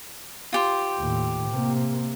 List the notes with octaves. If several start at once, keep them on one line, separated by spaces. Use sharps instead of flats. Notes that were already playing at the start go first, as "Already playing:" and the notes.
F4 G4 C5
D#2 A2
C3 A#3